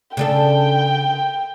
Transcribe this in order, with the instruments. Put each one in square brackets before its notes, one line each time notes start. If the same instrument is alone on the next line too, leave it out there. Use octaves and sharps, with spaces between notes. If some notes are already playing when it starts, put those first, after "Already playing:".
[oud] C#3 D4 A4 [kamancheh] G5